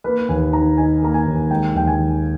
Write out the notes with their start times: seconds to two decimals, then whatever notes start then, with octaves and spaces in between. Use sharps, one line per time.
0.04 A#3 B4
0.29 D#2 G#5
0.53 D#3 A#5
0.77 D#4 G#5
1.02 A#3 A#5
1.14 G#5
1.26 D#2
1.50 G#3 G5
1.74 D#2 G5
1.87 G#5
1.99 D#3